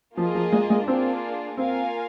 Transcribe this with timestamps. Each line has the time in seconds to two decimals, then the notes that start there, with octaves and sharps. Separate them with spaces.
0.17 F3 A#3 F4 G#4 D#5
0.35 F3
0.52 G#3
0.70 G#3
0.87 A#3 C4 D4 F4 G#4
1.57 A#3 C4 F4 A#4 F5 G#5